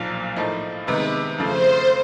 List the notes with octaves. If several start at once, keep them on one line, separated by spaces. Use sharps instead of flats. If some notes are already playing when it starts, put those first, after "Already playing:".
Already playing: B1 A#2 F3 A#3
A2 F3 A#3 D#4
C3 D#3 G#3 B3 D#4 B4
F2 C#3 F3 A3 C5